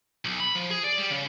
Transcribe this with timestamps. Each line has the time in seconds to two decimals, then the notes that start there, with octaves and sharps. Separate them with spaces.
0.25 B1
0.40 B5
0.55 F3
0.71 G#4
0.84 D5
0.98 G3
1.11 C#3